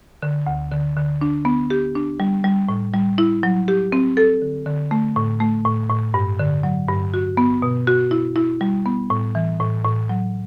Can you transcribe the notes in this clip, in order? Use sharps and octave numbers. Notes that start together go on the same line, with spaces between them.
D3
D2
D3
D3
D4
B3
G4
D4
G3
G3
A2
G3
E4
F#3
G4
C4
A4
D3
D3
A3
A2
A3
A2
A2
G2
D3
F#3
G2
F#4
B3
B2
F#4
E4
E4
G3
B3
A2
E3
A2
A2
F#3